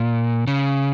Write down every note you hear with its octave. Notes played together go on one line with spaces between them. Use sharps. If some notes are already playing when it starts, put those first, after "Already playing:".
Already playing: A#2
C#3